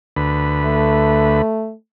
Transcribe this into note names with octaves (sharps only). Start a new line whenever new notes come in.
D2 B4
A3